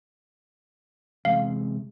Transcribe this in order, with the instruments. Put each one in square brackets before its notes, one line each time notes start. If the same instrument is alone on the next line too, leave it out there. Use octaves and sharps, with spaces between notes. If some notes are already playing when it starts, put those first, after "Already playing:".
[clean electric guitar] E2 C3 G#3 [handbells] F5